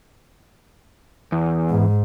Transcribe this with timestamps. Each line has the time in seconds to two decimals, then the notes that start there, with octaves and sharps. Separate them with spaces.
1.32 E2
1.70 G#2